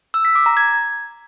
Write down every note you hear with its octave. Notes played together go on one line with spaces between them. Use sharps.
E6
B6
D6
A#5
G#6